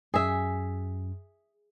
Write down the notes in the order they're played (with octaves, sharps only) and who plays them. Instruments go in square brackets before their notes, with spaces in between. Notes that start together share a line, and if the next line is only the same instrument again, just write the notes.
[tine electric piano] F#2 [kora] G#4 E5